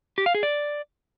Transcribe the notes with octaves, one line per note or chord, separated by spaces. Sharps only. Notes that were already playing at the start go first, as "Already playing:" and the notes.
G4
F5
G#4
D5